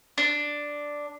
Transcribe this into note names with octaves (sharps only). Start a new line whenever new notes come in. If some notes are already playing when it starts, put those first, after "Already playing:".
D4